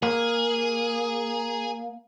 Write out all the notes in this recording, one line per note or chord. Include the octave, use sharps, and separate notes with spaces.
A#3 G#4